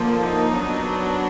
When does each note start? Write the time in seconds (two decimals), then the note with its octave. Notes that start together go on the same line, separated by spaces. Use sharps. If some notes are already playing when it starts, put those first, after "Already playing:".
Already playing: D3 F3 A#3
0.21 D#4
0.53 F#3 B3 D4